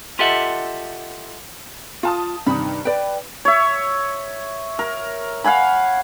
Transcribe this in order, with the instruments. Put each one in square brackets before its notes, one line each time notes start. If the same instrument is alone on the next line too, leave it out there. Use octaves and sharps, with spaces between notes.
[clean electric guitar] F4 G4 A4 D#5 E5 F#5
[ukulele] F4 [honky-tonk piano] F5 A5 D#6
[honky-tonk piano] G2 C3 D#3 [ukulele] D#4 B5
[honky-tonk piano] B4 [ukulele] D5 G5
[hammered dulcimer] C#5 E5
A#4
F5 F#5 G#5 B5